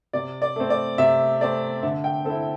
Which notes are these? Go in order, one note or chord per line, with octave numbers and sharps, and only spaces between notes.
C3 D5
D5
A3 C4
D5
C3 E5
A3 C4 D5
D3 E5
G5
C4 E4 A4